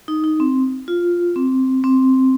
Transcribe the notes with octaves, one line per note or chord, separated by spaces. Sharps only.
D#4
D#4
C4
F4
C4
C4